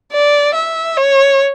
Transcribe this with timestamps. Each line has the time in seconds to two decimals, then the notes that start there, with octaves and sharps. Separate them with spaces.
0.12 D5
0.55 E5
0.97 C#5